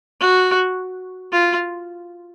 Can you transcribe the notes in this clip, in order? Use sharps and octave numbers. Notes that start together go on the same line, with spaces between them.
F#4
F4